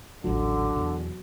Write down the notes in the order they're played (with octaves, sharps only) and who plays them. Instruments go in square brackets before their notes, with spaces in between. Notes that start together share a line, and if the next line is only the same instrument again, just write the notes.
[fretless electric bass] D#1 A1 [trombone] D3 [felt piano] F#3
[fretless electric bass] E2 B2